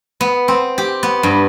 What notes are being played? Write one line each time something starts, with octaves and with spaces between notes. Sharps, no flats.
B3
C4
G4
B3
G2